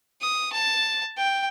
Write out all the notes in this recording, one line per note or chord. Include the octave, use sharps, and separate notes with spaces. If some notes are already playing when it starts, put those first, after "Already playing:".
D#6
A5
G5